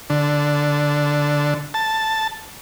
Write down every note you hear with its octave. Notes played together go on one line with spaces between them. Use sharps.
D3
A5